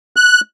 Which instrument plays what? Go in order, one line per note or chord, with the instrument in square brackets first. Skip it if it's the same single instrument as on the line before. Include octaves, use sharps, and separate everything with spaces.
[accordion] F#6